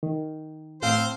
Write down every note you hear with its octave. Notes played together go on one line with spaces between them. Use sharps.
D#3
A2 C4 C5 F5